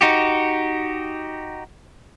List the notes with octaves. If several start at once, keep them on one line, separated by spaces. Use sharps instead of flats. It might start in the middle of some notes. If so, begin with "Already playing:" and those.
D#4 F#4 G4